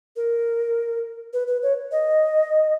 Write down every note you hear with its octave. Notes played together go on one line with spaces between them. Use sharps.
A#4
B4
B4
C#5
D#5